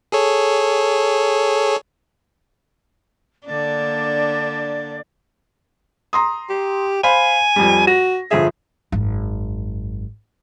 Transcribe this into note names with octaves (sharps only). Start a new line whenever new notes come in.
G#4 A4 C#5
D3 A#3 D4 D5
A#5 C6 D#6
G4
C5 F5 G#5 B5
F2 G3
F#4 A#6
G1 F3 G#4 E5
G#1 F#2